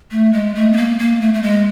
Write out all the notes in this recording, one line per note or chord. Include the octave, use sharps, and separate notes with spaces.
A3
G#3
A3
B3
A#3
A#3
A3
A3
G#3